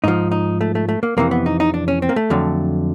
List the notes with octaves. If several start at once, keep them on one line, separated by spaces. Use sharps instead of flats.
G#2 F3 D#4
D#4
A3
A3
A3
A#3
F2 C3 E3 A#3
B3
D#4
D#4
D4
C#4
C4
A#3
A3
F2 D3 F#3